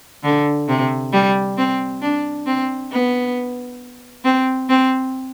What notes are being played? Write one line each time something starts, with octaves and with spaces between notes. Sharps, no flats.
D3
C3
G3
C4
D4
C4
B3
C4
C4